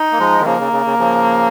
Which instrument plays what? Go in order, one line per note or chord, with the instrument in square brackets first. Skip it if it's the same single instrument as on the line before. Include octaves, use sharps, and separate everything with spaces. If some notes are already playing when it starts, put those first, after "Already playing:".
Already playing: [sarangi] D#4
[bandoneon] A#3
F3 G#3
D#3
[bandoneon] C#3 F3 [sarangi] A#3
[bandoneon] C#3
C#3
C#3
C#3 F3